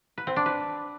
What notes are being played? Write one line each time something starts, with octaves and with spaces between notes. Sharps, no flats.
B4
C4
D4
B4